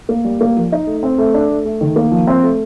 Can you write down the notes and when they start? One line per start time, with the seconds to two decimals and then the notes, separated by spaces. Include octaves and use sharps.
0.09 A#3
0.24 G3
0.41 A#3
0.56 F3
0.72 D#4
0.87 A3
1.03 C4
1.18 A3
1.34 D4
1.50 A3
1.65 A3
1.81 D#3
1.96 A#3
2.11 F3
2.27 C4
2.43 A3